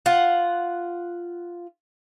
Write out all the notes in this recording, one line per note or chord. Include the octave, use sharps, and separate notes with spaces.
F4 F#5